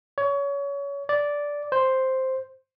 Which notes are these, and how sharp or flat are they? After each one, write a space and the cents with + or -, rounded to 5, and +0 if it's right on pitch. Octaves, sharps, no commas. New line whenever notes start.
C#5 +25
D5 -10
C5 +0